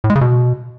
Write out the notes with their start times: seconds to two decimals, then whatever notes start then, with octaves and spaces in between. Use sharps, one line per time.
0.04 A2
0.10 G#3
0.15 C#3
0.21 B2